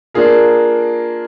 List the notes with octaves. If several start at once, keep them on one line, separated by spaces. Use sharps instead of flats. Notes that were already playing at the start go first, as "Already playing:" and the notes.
A#3 D4 F4 G#4 A#4